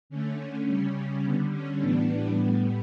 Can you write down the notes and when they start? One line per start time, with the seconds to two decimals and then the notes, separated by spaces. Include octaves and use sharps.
0.10 D3 A3 C#4
0.67 C#3 G3 C#4
1.24 D3 G3 B3
1.52 C#4
1.81 A2 E3 G3 B3 D4
2.38 A2 G3 B3